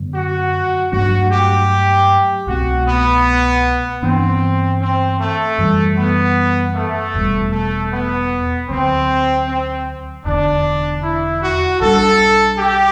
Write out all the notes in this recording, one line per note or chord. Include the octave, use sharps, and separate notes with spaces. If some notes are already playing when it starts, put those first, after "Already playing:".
Already playing: F#2 D3 F#3 B3
F#4
G2 F#3 A3 D4 F#4
G4
C2 B2 A3 C4 F#4
B3
G2 E3 B3 C4 D4
C4
A3
F#2 E3 G3
B3
A3
E1 E2 B2 G3
A3
B3
D2 D3 F#3 C4
C4
E1 E2 D3 D4
E4
F#4
B1 B2 G3 D4 A4
G4